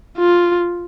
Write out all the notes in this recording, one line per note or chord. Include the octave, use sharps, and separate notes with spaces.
F4